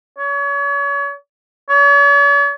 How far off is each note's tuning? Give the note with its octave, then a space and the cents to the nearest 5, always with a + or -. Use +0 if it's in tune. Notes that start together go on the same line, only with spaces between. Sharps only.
C#5 +35
C#5 +45